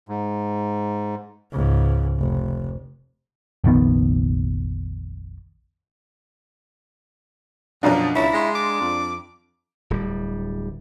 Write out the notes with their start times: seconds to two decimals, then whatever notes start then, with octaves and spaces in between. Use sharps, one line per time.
0.09 G#2
1.52 C#2 G#2
2.18 F1
3.64 F1 A#1 D#3 B3
7.83 F#2 B2 F3 F#3 D4 F5 A#5
8.16 C#2 E4 C#5
8.33 G#3 C6 A#6
8.55 D6
8.81 F2
9.90 D1 G3